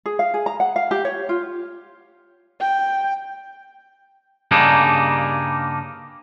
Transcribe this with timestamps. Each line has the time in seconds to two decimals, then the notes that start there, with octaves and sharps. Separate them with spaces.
0.06 G#4
0.19 F5
0.34 G#4
0.46 A#5
0.60 F#5
0.76 F5
0.91 G4
1.05 C#5
1.29 F4
2.60 G5
4.51 G2 C#3 G3 A#3 D4 D#4